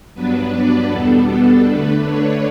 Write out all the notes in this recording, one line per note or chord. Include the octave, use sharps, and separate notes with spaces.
G2 F#3 B3 D4 B4
D5
E2 B2 G3 B3 D4 A4
A4
D3 A3 D4 B4
C#5